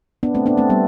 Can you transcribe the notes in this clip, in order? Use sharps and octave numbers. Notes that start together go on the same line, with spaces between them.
B3 D4
A3 C4
B3 D4
A3 C4
G3 B3